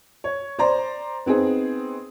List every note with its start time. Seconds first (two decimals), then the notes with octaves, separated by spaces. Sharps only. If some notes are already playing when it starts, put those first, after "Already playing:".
0.24 C#5
0.59 C5 D5 A#5 C6
1.26 B3 C4 D#4 G#4